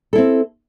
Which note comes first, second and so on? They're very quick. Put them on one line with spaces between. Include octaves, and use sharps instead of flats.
A4 E4 C4